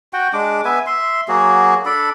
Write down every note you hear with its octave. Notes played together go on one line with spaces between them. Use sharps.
F#4 F#5 G5
G#3 D4 D6
B3 B4 E5 G#5
E5 C6
F#3 A#3 F#4 G#4
D4 A4 D5 B5